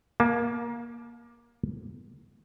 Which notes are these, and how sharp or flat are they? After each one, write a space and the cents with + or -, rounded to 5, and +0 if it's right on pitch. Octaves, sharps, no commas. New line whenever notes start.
A#3 +20 A5 -30